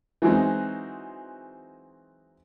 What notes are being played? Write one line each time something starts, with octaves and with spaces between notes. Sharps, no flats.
E3 F#3 G#3 C4 D#4